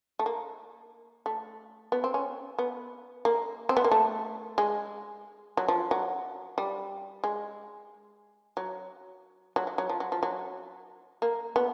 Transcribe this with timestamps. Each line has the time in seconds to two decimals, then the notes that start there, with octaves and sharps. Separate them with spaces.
0.19 A3
0.26 A#3
1.26 A3
1.92 B3
2.04 C4
2.14 C#4
2.58 B3
3.25 A#3
3.69 C4
3.77 B3
3.84 A#3
3.91 A3
4.58 G#3
5.57 F#3
5.68 F3
5.91 F#3
6.58 G3
7.24 G#3
8.57 F#3
9.56 F#3
9.67 F#3
9.78 F#3
9.89 F3
10.00 F#3
10.12 F3
10.23 F#3
11.22 A#3
11.56 B3